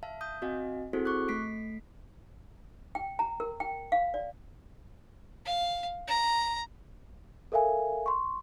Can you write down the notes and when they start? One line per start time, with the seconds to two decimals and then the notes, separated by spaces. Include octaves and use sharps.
0.03 E5 F5 A5
0.21 D#6 G6
0.42 C4 F#4 D#5 F5 G#5
0.93 C4 E4 F#4 G#4 A4 C5
1.05 C#6 D6 F#6
1.28 A3 B6 C7 D7
2.95 G5
3.19 A#5
3.40 A#4
3.60 G5
3.92 F5
4.14 D5
5.45 F5
6.07 A#5
7.52 A4 A#4 E5 F5 G#5
8.06 C6 C#6